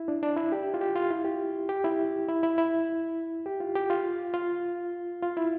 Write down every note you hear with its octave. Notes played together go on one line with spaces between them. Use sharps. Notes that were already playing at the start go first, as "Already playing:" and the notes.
Already playing: E4
D4
D4
E4
G4
F4
G4
F4
E4
G4
G4
E4
E4
E4
E4
G4
F4
G4
F4
F4
F4
E4